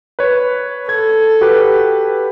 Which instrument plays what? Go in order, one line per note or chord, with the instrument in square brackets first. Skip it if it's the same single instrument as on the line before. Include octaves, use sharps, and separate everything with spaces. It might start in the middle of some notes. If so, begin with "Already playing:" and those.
[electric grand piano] B4 C#5
[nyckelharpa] A4 [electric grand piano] G#6
[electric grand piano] F#4 G4 B4